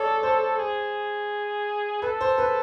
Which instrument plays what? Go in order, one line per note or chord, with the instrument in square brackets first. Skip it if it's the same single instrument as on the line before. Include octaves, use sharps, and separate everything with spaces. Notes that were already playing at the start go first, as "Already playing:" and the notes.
Already playing: [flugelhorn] A4 [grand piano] C#5 D5
[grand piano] C5
[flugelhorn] G#4
[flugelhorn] A4 [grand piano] B4
[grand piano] C5
B4